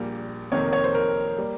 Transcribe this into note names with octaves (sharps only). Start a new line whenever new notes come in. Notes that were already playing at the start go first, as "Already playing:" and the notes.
Already playing: A#1 A#2 G3 A#3
F2 C3 D#3 A#3 C#5
C#5
C5
A#4
G3 A#3